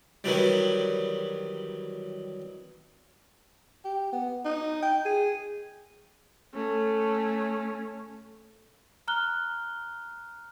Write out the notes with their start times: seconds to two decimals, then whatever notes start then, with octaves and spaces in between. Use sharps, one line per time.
0.24 D#3 E3 F#3 G3
3.85 G4
4.12 B3
4.45 D#4
4.82 G5
5.05 G#4
6.54 A3 C#4
9.08 A#5 F6 F#6 G7